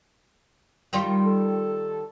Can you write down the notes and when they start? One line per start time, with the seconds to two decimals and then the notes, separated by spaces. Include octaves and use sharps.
0.93 D#3 G3 F4
1.25 A4